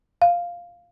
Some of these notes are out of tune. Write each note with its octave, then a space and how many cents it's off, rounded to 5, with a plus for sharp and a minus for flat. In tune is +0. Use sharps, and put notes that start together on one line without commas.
F5 +0